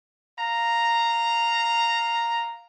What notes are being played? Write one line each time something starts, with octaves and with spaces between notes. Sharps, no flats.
F5 A#5